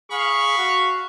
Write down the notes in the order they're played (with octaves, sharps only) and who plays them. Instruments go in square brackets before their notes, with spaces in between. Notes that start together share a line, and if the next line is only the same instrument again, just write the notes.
[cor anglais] G#4 [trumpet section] F5 B5 C#6
[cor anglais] F#4